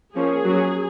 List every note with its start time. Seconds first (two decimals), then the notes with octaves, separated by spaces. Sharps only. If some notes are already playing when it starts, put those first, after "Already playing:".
0.16 F3 A#3 C#4 G#4
0.45 F#3 C#4